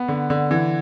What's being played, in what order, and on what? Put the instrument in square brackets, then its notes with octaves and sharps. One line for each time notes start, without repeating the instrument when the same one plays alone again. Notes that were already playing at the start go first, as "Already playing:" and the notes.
Already playing: [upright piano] B3
D3
D3
E3